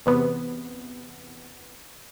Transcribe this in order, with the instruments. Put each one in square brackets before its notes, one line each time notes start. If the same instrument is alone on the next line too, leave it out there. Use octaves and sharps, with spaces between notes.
[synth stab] E2 C3 B3